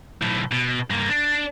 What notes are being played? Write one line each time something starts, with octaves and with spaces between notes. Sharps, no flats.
B1 A2
B2
G2 A#3
D4